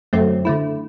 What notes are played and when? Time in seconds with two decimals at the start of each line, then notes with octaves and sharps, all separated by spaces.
0.13 F#2 D3 F#3 A3 C4
0.45 D3 A3 E4